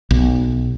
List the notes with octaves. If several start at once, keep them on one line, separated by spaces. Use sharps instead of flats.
B1